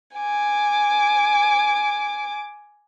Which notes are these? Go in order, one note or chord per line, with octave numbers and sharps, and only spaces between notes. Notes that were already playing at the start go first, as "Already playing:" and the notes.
G#5 D6